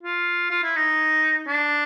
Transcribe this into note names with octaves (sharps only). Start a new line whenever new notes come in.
F4
F4
E4
D#4
D4